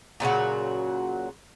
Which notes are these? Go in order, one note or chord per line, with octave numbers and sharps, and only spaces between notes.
A#2 C#3 F#3 F#4